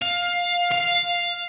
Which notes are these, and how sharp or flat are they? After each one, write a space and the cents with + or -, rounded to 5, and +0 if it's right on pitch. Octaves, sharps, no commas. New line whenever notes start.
F5 +15
F5 +0